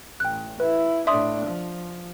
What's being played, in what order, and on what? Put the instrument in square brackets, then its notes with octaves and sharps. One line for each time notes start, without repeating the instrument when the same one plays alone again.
[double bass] A1 [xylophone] G5 F#6
[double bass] E4 [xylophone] B4
[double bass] A2 D4 [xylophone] E5 C6 D#6
[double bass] F3